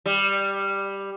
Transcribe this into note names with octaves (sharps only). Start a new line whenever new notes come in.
G3